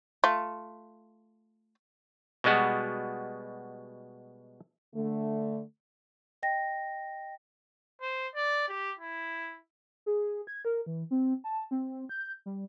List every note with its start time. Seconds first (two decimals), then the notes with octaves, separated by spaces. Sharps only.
0.24 A3 F4
2.44 B2 G3 G#3 B3 F#4
4.95 D3 A3
6.43 D#5 G5 A#6
8.01 C5
8.35 D5
8.69 G4
9.00 E4
10.06 G#4
10.47 G#6
10.65 A#4
10.86 E3
11.11 C4
11.44 A5
11.71 C4
12.09 G6
12.46 G3